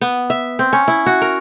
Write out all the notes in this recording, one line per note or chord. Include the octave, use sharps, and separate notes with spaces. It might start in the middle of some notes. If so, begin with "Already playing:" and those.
B3
E5
C4
C#4
E4
F#4
A#4